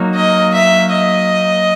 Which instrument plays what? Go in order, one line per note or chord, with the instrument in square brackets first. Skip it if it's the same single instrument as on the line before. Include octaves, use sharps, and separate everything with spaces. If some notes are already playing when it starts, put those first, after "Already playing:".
Already playing: [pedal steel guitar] F#3 A#3 D#4 F#4
[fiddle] D#5
E5
D#5